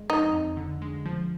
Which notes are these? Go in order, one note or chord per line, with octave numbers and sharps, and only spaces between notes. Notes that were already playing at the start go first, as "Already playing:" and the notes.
Already playing: G#3
F2 D#4
F2
D3
G#3
F3